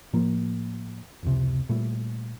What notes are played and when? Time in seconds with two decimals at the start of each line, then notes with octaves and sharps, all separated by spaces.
0.13 A2 F3 A#3
1.23 F1 C#2 C3
1.69 A#2 G3 A3